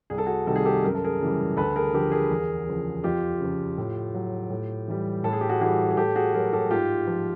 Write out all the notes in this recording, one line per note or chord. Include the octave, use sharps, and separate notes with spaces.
C2 G#4
A4
F#4 G#4
C3 D#3 G3 A4
G#4
G4 A4
F#2 A#4
A4
G#4 A#4
C#3 E3 G3
D2 A4 B4
G#4 A#4
D3 F3 G4 A4
G#4 A#4
E2
C#3 F3
F2 F4 G4
C#3 F3
A2
F#3
A2
E3 G3
A2 A4
G#4
G4
F#4 G#4
E3 G3 F#4 G#4
G#4
A2 G4 A4
F#4 G#4
F#3 G#4 A#4
G4 A4
G#2 F4 G4
F3